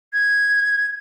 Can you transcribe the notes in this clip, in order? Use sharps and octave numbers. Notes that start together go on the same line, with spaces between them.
G#6